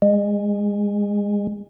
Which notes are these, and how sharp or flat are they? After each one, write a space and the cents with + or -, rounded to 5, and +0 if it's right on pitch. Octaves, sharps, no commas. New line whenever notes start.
G#3 -25